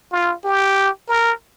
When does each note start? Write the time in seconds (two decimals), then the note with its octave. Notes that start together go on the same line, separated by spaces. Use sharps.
0.12 F4
0.44 G4
1.09 A#4